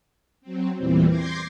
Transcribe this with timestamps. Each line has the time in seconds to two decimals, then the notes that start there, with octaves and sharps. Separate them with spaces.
0.41 F#3 C4
0.78 E2 A#2 E3 G3 C4
1.09 C6 D6 G6 G#6 A#6 C7